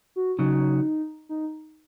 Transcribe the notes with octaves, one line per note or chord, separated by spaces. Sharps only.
F#4
C#3 F#3 D#4
D#4